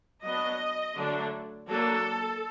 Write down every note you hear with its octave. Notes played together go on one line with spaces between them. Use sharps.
F#3 B3 D4 D#5
D3 F#3 A3 D4
F#3 A#3 D4 A4